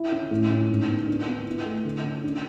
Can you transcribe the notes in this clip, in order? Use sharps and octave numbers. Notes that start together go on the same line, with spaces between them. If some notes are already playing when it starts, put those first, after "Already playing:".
Already playing: E4
C#4
A2
C#4
G#2
B3
D4
B3
E4
A3
D3
C#4
D4